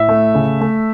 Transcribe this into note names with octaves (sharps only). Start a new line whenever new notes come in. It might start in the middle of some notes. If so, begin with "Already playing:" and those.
Already playing: A2 E5
A3
C#3
A3